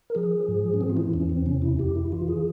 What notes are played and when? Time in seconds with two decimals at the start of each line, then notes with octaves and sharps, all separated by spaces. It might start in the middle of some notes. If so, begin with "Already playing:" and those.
0.10 A#4
0.15 F3 G#4
0.48 G#2
0.74 C#4
0.81 E3 C4
0.90 F4
0.97 E4
1.13 E2 C#4
1.29 C4
1.46 C3 C#4
1.62 E4
1.79 F2 G4
1.96 E4
2.12 E3 F4
2.28 G#4